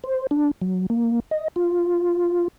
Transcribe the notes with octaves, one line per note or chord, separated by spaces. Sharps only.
C5
D4
F#3
A#3
D#5
F4